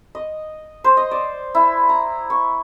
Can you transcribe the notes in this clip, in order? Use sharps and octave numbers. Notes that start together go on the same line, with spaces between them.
D#5
C5
D#5
D5
E4
A#5
C#6